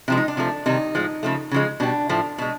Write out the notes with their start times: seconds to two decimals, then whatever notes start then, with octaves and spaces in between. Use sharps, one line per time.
0.08 C3 F3 G#3 E4
0.17 D#4
0.28 D4
0.37 C3 F3 A3
0.66 C3 D#3 G3 D#4
0.95 A2 F3 G#3
1.23 C#3 F3 A3
1.51 C#3 F3 G#3
1.80 B2 G3 D4
2.09 A2 F3 A3
2.38 B2 G#3